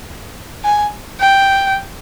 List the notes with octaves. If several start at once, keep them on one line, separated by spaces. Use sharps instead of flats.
G#5
G5